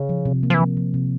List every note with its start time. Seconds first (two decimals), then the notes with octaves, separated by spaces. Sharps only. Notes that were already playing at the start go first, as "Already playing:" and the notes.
Already playing: C#3
0.09 F3
0.25 C3
0.43 A#3
0.50 F3
0.54 E3
0.60 F3
0.77 F3
0.94 C3